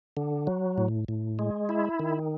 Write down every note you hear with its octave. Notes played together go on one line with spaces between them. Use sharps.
D3
F#3
A2
A2
G#3
E4
D#3